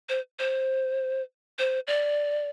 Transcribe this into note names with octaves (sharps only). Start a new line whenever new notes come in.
C5
C5
C5
D5